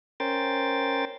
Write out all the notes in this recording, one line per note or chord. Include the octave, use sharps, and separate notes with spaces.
C#4 A#4 C5 G5 A6